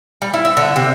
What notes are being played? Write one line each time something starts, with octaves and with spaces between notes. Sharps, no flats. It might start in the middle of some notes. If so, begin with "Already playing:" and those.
G3
E4
E5
D3
C3